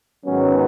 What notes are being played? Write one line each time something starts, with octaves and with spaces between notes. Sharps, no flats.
G#2 D#3 F#3 B3 C#4